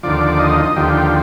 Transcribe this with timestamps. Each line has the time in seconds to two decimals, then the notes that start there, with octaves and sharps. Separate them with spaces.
0.03 D#2 D3 F3 D5
0.39 D#5
0.76 D#2 D3 F3 G4